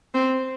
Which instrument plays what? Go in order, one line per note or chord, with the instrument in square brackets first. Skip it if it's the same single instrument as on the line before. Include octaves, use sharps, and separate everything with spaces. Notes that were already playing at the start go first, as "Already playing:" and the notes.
[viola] C4